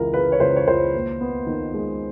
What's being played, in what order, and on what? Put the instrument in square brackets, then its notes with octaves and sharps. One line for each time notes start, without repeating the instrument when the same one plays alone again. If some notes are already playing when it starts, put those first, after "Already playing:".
Already playing: [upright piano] C#2 E3 A#4
C#3 B4
C#5
C#2 C5
C#5
C#2 C5
D#2
B3
D#3
G#3